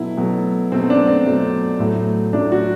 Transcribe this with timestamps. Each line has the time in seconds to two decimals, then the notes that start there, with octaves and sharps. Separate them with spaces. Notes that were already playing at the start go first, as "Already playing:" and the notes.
Already playing: B2 F#3 A3 E4
0.17 B2 F#3 A3
0.72 B2 F#3 A3 C4
0.90 D4
1.07 C4
1.26 B2 F#3 A3
1.79 A2 F#3 A3
2.33 A2 F#3 A3 D4
2.52 F#4